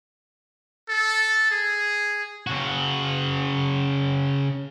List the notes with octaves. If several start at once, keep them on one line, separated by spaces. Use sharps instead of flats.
A4
G#4
C#3 F#4